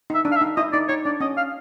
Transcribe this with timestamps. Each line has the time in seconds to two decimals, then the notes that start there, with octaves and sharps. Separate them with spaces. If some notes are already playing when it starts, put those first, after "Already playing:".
0.10 D#4 E5
0.25 D4
0.32 F5
0.36 E5
0.41 D#4
0.57 E4 D#5
0.73 D#4 D5
0.89 D#4 C#5
1.05 D4 D5
1.20 C#4 D#5
1.37 F5